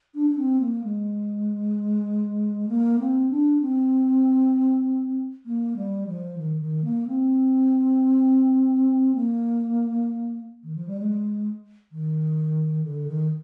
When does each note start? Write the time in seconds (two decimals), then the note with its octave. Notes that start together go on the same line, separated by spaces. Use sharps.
0.14 D4
0.30 D4
0.38 C4
0.61 A#3
0.84 G#3
2.69 A#3
2.99 C4
3.30 D4
3.61 C4
5.46 A#3
5.76 G3
6.07 F3
6.38 D#3
6.61 D#3
6.84 A#3
7.07 C4
9.15 A#3
10.64 D#3
10.76 F3
10.87 G3
10.99 G#3
11.92 D#3
12.84 D3
13.08 D#3